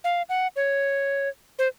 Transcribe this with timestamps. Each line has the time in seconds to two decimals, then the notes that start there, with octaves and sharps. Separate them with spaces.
0.04 F5
0.29 F#5
0.56 C#5
1.59 C5